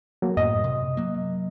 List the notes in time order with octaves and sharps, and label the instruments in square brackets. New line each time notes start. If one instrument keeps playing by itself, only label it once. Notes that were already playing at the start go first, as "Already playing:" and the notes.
[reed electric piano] F#3 A#3
[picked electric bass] F#2 A2 [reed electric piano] D#5
[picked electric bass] C3
F#3 A#3